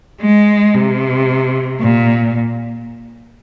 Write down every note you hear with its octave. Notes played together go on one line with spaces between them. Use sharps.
G#3
C3
A#2